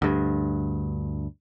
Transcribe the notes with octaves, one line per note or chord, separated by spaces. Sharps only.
D2 G2